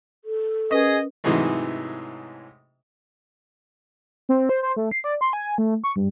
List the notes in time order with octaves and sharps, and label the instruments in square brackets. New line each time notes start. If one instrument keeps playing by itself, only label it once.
[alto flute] A4
[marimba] C#4 A#4 B4 [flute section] G#4 D#6 [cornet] D#5
[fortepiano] G#2 C3 E3 F#3 G#3 A3
[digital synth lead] C4
C5
C5
A3
C7
D5
C6
G#5
A3
C#6
G2